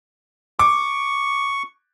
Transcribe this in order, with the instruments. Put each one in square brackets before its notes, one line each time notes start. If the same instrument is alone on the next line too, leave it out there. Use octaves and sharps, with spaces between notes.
[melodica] C#6 [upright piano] D6